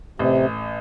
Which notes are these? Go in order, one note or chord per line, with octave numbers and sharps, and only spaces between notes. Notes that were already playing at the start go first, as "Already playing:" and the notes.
A1 C3